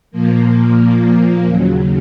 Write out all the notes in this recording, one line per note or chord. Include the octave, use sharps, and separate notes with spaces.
A#2 F3 A#3
D#2 C#3 F#3